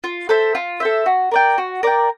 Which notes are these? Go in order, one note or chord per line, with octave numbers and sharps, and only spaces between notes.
F4
A4 C5 E5
F4
A4 C5 E5
F#4
A#4 D5 G5
F#4
A#4 D5 G5